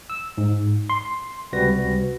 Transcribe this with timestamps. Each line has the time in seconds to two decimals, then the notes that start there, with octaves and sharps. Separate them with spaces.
0.10 E6
0.38 G#2
0.90 C6
1.52 C#2 C3 G3 F#4 B4 A#6